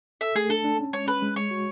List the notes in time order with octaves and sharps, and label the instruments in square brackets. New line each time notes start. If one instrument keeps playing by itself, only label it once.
[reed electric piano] A4 [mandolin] E5
[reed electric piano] A3 [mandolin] G#4
[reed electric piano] D4 [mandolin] A4
[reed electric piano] D4
C#4
[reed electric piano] G#3 [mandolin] C#5
[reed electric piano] C#4 [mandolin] B4
[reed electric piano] G#3
[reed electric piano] G#3 [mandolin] C#5
[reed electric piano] F#4